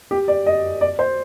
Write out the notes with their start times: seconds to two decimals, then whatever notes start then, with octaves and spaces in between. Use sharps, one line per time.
0.11 G4
0.28 D5
0.46 D#5
0.81 D5
0.99 C5